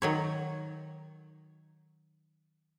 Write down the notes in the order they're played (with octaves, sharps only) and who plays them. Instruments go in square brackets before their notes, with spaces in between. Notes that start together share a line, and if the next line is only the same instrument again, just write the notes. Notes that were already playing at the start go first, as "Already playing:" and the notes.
[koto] D#3 F#3 C#5